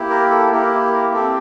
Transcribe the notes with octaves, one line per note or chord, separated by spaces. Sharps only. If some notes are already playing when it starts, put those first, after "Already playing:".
Already playing: A#3 E4 G4
A#4
A4
A#3 E4 G4 A#4
A#4
C4 G4 A4